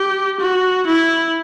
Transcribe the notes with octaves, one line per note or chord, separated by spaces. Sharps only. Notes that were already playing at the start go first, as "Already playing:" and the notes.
Already playing: G4
F#4
E4